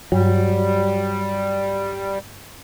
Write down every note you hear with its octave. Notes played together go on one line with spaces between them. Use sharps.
G2 F#3 G3